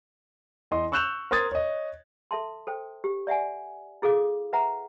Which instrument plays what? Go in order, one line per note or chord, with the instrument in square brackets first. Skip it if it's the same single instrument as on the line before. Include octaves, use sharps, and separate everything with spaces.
[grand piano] E2 D#5 C6
C#6 E6 F#6 G6 E7 F7
A#4 C5 C6 D#6 G#6 A6
C#5 D#5
[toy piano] A4 E5 A5 C6
A4 C5 G5
G4
D5 E5 F#5 G#5
E4 G#4 A4 F5 D6
B4 E5 F#5 A#5